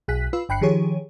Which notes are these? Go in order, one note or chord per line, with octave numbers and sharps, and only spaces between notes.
B1 G#4 F#6 B6
F4 B4 E6
G1 G5 B5 F#6 C7 C#7
D#3 F3 G4 G#4 C#5